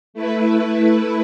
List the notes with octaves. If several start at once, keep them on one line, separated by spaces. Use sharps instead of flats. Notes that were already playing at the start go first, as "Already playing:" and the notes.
A3 E4 B4